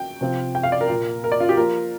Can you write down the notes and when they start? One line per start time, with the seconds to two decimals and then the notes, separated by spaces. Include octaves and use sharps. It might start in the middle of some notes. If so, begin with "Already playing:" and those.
Already playing: G5
0.21 C3 F3 C4 F4
0.55 G5
0.63 F5
0.72 D5
0.81 A#4
0.89 A#2 A#3 F4
1.24 A#4
1.32 D5
1.40 F4
1.49 G4
1.57 F3 A#3 F4 A#4